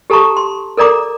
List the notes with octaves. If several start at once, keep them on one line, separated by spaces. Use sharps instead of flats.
G4 A4 A5 A#5 C#6
C6
A4 A#4 D5 A#5 D6